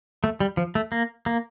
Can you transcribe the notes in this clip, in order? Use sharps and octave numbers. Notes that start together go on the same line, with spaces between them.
A3
G3
F3
A3
A#3
A#3